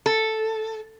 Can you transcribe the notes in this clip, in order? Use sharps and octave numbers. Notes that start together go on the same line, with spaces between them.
A4